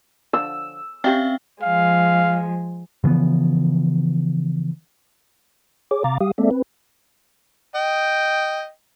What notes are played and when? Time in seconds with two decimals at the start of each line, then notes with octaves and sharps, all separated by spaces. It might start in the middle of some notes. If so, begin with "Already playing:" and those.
0.33 D3 F3 E6
1.04 C4 C#4 G4 D5 E5 F5 G5
1.63 F3 G#3 F5
3.04 C#3 E3 F3 B3
5.91 G#4 C#5 D6
6.04 C3 F5 A#5 D6 A6
6.20 G3 G4 F5 D#6
6.38 G#3 A#3 C4 A4 D5 E5
6.51 C4 B4
7.75 D#5 G5